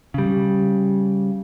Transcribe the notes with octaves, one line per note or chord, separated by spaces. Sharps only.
C#3 G3